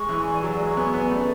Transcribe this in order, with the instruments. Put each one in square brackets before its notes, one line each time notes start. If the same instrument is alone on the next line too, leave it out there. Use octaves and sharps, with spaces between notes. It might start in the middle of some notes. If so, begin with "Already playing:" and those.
Already playing: [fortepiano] G#3 [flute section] C#6
[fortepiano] E3 [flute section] G#5
[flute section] D5
[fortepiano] F#3 [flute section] G#4
[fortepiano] G#3 [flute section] C#6
[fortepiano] B3 [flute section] G#5
[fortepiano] B3 [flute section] D5
[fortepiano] A3 [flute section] C#4